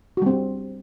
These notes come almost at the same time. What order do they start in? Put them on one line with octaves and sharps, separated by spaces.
F#4 G3 C4